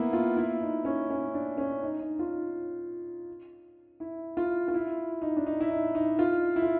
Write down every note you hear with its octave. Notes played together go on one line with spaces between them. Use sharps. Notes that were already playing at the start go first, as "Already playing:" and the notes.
Already playing: A#3 B3 E4
F4
E4
D#4
C#4
C#4
D4
C#4
D#4
D#4
F4
E4
F4
F4
E4
D#4
D4
D#4
E4
D#4
D#4
F4
E4
F4